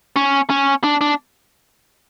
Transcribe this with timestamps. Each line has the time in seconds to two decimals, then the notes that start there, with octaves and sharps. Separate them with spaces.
0.16 C#4
0.50 C#4
0.84 D4
1.01 D4